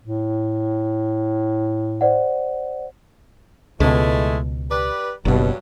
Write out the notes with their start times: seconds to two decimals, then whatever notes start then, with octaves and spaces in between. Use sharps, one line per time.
0.03 A2
2.01 C5 D5 F#5
3.80 C#2 B2 E3 G#3 A3
4.70 G4 B4 D5
5.25 F#1 G2 B2 F#3